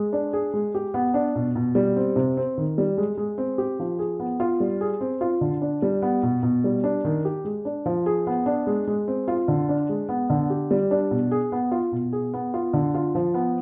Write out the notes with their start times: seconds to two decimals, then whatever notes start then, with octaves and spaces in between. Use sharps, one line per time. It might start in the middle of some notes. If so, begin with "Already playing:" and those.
Already playing: G#3
0.13 D4
0.33 G#4
0.54 G#3
0.75 G4
0.94 B3
1.14 D4
1.35 B2
1.55 B2
1.75 G3
1.96 C4
2.16 C3
2.37 C4
2.58 D#3
2.78 G3
2.98 G#3
3.17 G#3
3.38 C4
3.58 G4
3.80 F3
3.99 G#4
4.20 B3
4.40 F4
4.60 G3
4.81 G#4
5.01 C4
5.21 F4
5.41 D3
5.62 D4
5.82 G3
6.02 B3
6.23 B2
6.43 B2
6.64 G3
6.84 D4
7.05 D#3
7.25 G4
7.45 G#3
7.65 D4
7.86 F3
8.06 G#4
8.27 B3
8.46 D4
8.67 G#3
8.87 G#3
9.08 C4
9.28 F4
9.48 D3
9.69 D4
9.89 G#3
10.09 B3
10.30 D3
10.50 G4
10.71 G3
10.91 D4
11.11 B2
11.31 G#4
11.52 B3
11.71 F4
11.92 B2
12.13 G#4
12.34 B3
12.54 F4
12.73 D3
12.94 F4
13.15 F3
13.34 B3